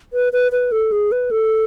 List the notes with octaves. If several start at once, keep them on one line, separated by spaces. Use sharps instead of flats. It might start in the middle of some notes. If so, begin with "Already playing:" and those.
B4
B4
B4
A4
G#4
B4
A4